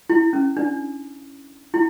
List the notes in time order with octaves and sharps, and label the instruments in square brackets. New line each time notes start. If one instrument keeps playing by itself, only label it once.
[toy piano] E4
C#4
D4
E4